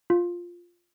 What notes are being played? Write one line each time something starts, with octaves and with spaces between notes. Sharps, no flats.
F4